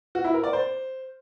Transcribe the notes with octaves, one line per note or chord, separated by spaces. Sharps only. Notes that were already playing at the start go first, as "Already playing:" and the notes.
F#4
E4
A#4
D5
C5